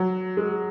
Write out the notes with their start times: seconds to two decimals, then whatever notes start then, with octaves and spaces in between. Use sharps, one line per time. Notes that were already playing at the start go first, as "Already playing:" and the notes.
Already playing: F#3
0.37 G#3